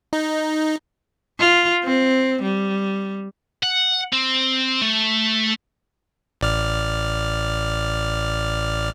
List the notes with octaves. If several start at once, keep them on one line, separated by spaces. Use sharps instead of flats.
D#4
F4
C4
G3
F#5
C4
A3
A1 D5 F6